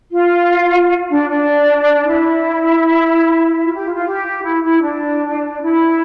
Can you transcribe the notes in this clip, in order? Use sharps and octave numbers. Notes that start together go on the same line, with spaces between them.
F4
D4
D4
E4
F4
G4
F4
F4
G4
E4
E4
D4
E4